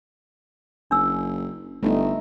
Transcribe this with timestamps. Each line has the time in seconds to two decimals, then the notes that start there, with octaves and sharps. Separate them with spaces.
0.91 F#1 D4 E6
1.83 G1 A3 D#4